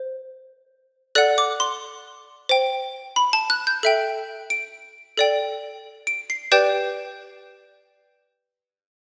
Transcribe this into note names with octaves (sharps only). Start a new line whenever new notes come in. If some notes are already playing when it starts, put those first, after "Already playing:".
Already playing: C5
A4 D5 F#5 F#6
D6
C6
C5 G5
B5
A5
F#6
G6
A4 E5 G5
D7
A4 D5 G5
D7
C7
G4 B4 D5 G5 G6